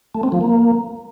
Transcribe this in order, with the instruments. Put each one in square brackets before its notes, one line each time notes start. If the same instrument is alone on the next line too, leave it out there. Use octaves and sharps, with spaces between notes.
[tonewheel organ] A3
C4
F3
A#3